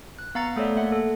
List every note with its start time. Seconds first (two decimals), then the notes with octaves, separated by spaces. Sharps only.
0.19 F#6
0.35 B3 F5 F#5 A#5 A6 C#7
0.56 A3 A4 C#5 D5 E5
0.76 A#3 E5 F#5
0.92 A4